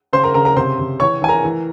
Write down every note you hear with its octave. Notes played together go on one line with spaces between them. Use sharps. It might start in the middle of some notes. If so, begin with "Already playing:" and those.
C#3 C5 C6
A#4 A#5
C#3 A#4 A#5
A#4 A#5
C3 C5 C6
C3
E3 C#5 C#6
E3 G#5
A#4 A#5
E3